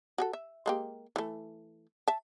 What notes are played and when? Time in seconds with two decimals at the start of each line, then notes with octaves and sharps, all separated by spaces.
0.18 F#4 G#4 A4
0.33 E5
0.66 G#3 A#3 G4
1.16 E3 A3
2.08 E5 A5